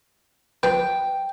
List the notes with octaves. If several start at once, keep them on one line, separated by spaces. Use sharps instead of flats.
F3 B4 G5